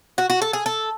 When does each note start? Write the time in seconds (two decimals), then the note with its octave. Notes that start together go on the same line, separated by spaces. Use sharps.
0.18 F#4
0.30 F#4
0.42 A4
0.53 G#4
0.66 A4